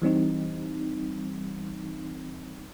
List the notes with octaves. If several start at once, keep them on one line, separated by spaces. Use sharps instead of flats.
E3 G3 C4 D#4